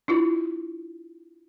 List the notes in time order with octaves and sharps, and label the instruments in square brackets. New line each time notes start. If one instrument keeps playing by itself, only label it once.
[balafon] D4 E4 F4